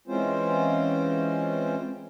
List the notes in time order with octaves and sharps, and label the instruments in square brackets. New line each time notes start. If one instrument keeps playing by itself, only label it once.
[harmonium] E3 G#3 C4 C#4 F4 C5